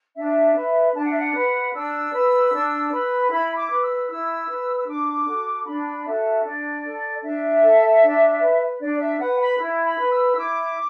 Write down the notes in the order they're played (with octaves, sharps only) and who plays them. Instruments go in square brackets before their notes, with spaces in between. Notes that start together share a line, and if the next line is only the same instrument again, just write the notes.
[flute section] D4 E5
B4
D4 A5
F#5
E5
F#5
B4
D4 E6
B4
D4
B4
E4 B5
D6
B4
E6
E4 E6
B4
E6
D4 D6
F#4 A4
D4 B5
F#4 A4 E5
D4 D5
A4
D4 E5
A4
D4
B4
D4 D5
E5
B4 F#5
B5
E4
B5
B4
E6
E4 D6